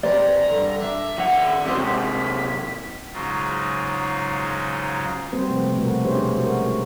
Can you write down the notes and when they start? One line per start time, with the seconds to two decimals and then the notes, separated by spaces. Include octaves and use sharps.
0.03 C3 B4 D5 G#5 A#5
0.48 G2 D3
0.80 D4 E5
1.18 D#3 F#5
1.66 C3 F#3 G#3 C4 B6
3.13 G#2 C#3 F#3 D#4 F4
5.32 G3 A#3 C4 F#4 B4 C5
5.49 C3 F3 A3
5.76 B2 A3 F#4 A#4 B4
6.05 C#4 D4 G4 G#4 C5 C#5
6.36 B2 G#3 F#4 A#4
6.63 G#3